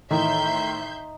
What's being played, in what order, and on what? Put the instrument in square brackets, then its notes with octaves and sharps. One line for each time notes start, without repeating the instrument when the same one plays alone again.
[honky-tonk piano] A2 D#3 E3 [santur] D#4 [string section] E5 C6 G6